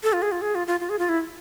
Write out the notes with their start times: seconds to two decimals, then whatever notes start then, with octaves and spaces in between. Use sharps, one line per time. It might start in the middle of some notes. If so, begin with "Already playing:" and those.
0.03 A4
0.13 F4
0.22 G#4
0.32 F4
0.41 G#4
0.55 F4
0.67 F4
0.80 F4
0.90 G#4
0.99 F4
1.09 E4